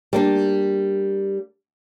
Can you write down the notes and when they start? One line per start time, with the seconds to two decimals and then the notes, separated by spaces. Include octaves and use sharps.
0.13 G3 A#3 D4